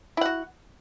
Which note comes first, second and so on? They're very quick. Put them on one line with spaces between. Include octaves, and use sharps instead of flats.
E4 F#5 F#4